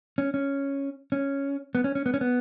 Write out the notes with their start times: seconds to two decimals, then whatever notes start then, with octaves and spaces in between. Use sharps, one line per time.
0.18 C#4
0.34 C#4
1.12 C#4
1.75 B3
1.84 C#4
1.95 C#4
2.06 B3
2.14 C#4
2.21 B3